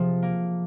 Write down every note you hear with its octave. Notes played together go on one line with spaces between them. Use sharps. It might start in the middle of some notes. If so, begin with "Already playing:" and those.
Already playing: C3 F3 G#4
A#3